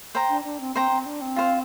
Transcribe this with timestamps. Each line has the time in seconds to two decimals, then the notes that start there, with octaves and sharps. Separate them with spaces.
0.15 C5 G5 A#5
0.29 D4
0.44 D4
0.60 C4
0.76 C4 C5 G5 A#5
0.91 C4
1.06 D4
1.21 C4
1.36 F4 C5 F5